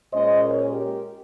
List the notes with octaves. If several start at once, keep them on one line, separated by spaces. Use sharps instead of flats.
A#2 G#3 C#4 C5 D#5
A#4 C#5
G4 A#4